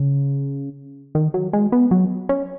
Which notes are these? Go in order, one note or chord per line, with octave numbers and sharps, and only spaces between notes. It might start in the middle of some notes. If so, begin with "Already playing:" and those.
Already playing: C#3
D#3
F#3
G#3
B3
F#3
C#4